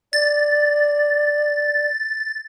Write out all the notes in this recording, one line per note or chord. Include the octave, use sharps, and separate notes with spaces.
D5 A6